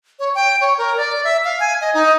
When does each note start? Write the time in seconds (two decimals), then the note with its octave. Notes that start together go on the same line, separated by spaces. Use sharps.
0.19 C#5
0.35 G5
0.61 C#5
0.78 A#4
0.97 D5
1.24 E5
1.44 F5
1.60 G#5
1.81 D#5
1.94 D#4